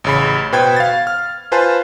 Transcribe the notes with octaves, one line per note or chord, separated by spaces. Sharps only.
A1 C#3 B5
B2 B4 C5 G5 B5 G#6
F5 A6
F6
F4 B4 C5 G#5 A5